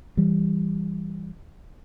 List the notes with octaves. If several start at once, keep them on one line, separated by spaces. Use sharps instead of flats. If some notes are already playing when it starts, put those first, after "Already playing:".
E3 G3